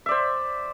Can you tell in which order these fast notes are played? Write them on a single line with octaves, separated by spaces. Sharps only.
E5 D5 C5